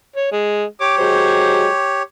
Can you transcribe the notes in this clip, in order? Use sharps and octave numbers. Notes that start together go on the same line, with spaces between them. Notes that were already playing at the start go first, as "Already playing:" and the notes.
C#5
G#3
G4 C#5 D6
F#3 G#3 C5